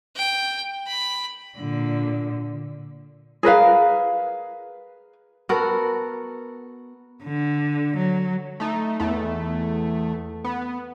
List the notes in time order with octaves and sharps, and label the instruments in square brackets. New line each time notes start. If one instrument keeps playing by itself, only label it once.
[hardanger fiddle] G5
B5
[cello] A#2 D3
[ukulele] G#4 A#4 B4 F5
[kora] B3 F#4 A4 A#4
[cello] D3
F#3
[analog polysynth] A3 D#4
E2 A3
B3